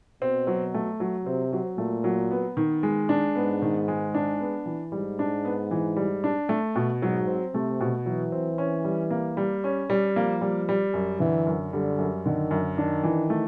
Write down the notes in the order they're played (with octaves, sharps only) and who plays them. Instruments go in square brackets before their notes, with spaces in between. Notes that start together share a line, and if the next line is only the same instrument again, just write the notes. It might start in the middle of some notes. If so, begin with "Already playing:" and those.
[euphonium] B2 [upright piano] C4
[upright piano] F#3
A3
F#3
[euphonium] C3 [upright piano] C4
[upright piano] F#3
[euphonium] A#2 [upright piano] A3
[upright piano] F#3
B3
D#3
G#3
D4
[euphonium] G#2 [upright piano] B3
[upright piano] D#3
G#3
D4
B3
E3
[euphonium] G#2 [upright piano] G3
[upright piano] D4
B3
E3
G3
D4
A3
B2
[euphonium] G#2 [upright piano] F#3
[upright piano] C4
[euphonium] C3 [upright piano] A3
[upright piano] B2
[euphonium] E3 [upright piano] F#3
[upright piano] C4
C#4
G3
A#3
G3
C#4
G3
[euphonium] F3 [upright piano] A#3
[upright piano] G3
G3
F#2
[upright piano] D3 [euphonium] E3
[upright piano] F#2
[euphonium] D3 [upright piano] G3
[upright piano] F#2
[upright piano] D3 [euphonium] D#3
[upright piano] F#2
[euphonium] D#3 [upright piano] D4
[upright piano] E3
A3